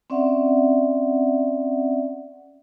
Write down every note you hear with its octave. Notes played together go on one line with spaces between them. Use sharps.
C4 C#4 D5 E5 F#5